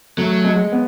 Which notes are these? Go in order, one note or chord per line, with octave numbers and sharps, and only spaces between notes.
F#3 A3
G#3
B3